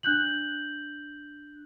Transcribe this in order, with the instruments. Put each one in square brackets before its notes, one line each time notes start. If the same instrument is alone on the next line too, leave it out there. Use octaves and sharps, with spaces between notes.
[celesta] D4 F#6 G6 F#7